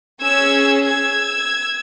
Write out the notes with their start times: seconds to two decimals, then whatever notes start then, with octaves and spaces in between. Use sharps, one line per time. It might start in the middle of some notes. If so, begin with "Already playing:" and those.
0.21 C#4 G#4 E6 G#6
0.83 E6 G#6